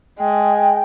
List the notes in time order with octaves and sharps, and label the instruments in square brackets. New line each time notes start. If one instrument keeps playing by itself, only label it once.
[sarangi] G#3 [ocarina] G5